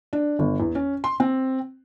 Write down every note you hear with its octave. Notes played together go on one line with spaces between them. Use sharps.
D4
G1
E2
C#4
C6
C4